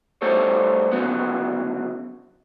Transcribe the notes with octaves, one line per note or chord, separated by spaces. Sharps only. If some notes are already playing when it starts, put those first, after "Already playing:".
G3 A3 A4 C5 C#5
D2 C#3 F#3 B3